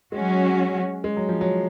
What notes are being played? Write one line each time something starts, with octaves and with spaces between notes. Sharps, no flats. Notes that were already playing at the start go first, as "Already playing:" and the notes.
F#3 G#3 C#4 F#4
G#3
F#3
F3
F#3